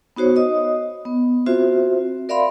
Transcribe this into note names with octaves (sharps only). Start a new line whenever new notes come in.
B3 D#4 F#4 C5 C#5
D#5 D#6
B3
C4 F4 F#4 C5 E5
A#4 D5 E5 F5 B5 C6